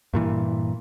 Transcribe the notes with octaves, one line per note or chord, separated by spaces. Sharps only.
G2 A#2 E3